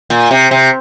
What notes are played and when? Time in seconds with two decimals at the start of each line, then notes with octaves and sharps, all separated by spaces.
0.10 A#2
0.31 C3
0.51 C3